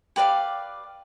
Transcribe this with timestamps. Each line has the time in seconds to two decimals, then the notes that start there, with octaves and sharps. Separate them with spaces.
0.16 G4 B4 D5 F5